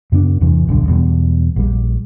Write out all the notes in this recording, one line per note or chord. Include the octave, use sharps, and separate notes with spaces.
F#2 C#3 B3 D4
E2 G2 C3 E3
D1 B1 G2 D3
E2 B2 G3
A#1 G3